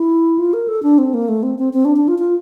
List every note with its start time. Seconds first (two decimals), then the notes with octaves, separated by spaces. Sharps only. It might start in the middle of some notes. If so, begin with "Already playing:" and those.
Already playing: E4
0.38 F4
0.53 A#4
0.68 A4
0.83 D4
0.98 C4
1.14 A#3
1.28 A3
1.43 C4
1.59 C4
1.73 C4
1.85 D4
1.96 D4
2.08 F4
2.19 F4